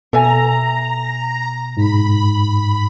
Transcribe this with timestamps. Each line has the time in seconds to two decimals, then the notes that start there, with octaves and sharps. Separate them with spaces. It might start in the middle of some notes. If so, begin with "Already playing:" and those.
0.13 B2 A4 E5 G#5 A#5
1.77 G#2 B5